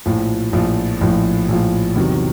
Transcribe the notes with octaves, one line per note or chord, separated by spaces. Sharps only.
A#1 A2 F3
A#1 A2 F3
A#1 A2 F3
A#1 A2 F3
E2 C3 D#3 F#3